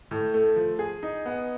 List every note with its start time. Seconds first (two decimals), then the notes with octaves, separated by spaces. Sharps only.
0.11 A2
0.34 A3
0.56 F3
0.79 G#4
1.03 D#4
1.26 B3